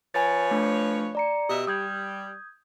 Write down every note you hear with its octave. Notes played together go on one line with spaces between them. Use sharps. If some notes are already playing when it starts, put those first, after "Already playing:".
F3 B4 C#5 G#5 A6
A3 D4
D5 A#5 C#7
B2 G4 D#5 E5
G3 D#6 G6 G#6